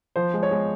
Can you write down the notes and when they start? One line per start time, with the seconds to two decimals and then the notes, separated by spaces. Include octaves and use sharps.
0.16 F3 C5
0.34 G#3
0.43 C#5
0.51 G#3